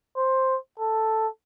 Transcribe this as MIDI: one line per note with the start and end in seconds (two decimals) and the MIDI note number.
0.17 0.57 72
0.80 1.27 69